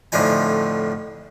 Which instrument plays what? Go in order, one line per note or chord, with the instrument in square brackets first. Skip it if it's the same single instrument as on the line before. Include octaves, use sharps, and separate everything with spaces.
[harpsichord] F2 A2 D3 F3 D#4 G#5